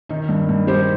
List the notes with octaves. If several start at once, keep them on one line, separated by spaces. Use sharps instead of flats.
D#3 D#4
G2
G2
G3 G4 C5